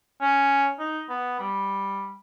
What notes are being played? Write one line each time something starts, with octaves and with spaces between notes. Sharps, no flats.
C#4
D#4
B3
G3